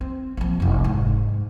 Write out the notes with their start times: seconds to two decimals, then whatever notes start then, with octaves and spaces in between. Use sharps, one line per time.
0.01 C4
0.37 A#1 F3
0.60 F1 C2
0.84 G#2